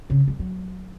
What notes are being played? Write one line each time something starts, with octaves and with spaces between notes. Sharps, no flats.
C#3
G#3
F#3